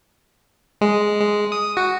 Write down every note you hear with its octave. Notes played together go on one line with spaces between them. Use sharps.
G#3
G#3
D#6
F#4